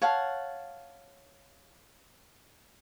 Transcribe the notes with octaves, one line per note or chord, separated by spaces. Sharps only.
C#5 F5 F#5 A5